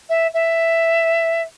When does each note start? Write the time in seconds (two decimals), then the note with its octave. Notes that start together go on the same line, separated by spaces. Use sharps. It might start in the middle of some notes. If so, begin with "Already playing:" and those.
0.09 E5
0.34 E5